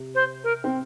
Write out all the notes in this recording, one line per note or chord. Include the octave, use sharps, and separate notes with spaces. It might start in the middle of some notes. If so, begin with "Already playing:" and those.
Already playing: C3
C5
A#4
C4